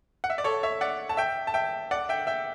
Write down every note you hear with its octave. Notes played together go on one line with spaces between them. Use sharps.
F#5
E5
D5
A4 C#5
C#5 E5
D5 F#5
A5
E5 G5
A5
E5 G5
D5 F#5
E5 G5
E5 G5